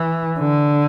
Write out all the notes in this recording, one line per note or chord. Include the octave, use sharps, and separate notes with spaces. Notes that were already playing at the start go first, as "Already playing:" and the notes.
Already playing: E3
D3